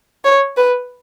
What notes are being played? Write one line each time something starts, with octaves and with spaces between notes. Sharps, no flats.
C#5
B4